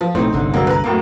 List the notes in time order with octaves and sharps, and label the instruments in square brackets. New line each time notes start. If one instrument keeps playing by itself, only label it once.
[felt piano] F3
[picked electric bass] B1 A2 [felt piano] C4 D#4
[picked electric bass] G1 C2 D3
[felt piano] E1 F#3 A#3
B4 A#5
F#2 A2 A#3